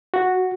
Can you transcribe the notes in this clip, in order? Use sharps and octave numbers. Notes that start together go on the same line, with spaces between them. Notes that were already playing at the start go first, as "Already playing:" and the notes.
F#4